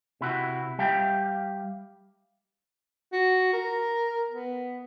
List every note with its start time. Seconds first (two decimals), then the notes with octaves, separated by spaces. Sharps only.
0.21 C3 E4 F#4
0.79 G3 G4 E5 F5 G5
3.13 F#4
3.53 A#4
4.30 B3